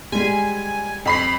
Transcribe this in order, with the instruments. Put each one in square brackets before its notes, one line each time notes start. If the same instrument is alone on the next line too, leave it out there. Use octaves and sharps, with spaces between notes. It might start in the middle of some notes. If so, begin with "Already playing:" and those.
[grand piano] G3 [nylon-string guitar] G#3 G#4 [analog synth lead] G#5
[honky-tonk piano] F2 B5 C7